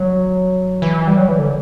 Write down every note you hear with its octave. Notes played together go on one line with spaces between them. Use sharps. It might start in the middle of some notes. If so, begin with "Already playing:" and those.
Already playing: F#3
E3
G3
F#3
E3
D3